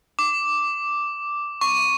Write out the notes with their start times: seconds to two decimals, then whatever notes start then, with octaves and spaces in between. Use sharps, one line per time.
0.19 D6
1.61 C#6